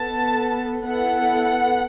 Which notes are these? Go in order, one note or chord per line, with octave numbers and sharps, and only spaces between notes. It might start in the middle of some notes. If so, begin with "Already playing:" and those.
Already playing: B3 A4 A5
B3 E4 A4 F#5